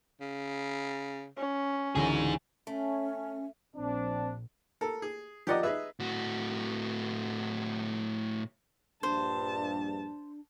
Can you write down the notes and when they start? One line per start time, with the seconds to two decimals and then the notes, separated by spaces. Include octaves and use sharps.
0.21 C#3
1.37 C#4
1.95 C#2 F#2 D3 E3 D#4 G#4
2.67 A3 C#4
3.76 A#1 C4 D4
4.81 A4 A#4
5.02 G#4
5.47 F3 G4 A#4 D5 D#5 F#5
5.63 D#4 G#4 B4 E5
6.00 A2 F#4
9.03 A#1 G2 D4 C5 A5